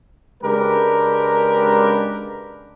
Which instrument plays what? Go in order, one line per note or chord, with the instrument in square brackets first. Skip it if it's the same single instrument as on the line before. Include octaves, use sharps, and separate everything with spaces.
[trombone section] C#3 G#3 D4 G4 A#4 B4